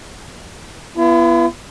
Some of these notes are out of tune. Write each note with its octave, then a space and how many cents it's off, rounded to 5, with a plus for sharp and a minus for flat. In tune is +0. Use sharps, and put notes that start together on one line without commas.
B3 -10 E4 +45